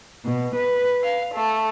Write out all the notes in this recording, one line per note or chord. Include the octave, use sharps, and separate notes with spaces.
B2
B4
F5
A3